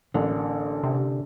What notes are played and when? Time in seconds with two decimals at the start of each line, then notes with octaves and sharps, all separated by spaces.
0.14 A1 D3 A#3
0.83 C3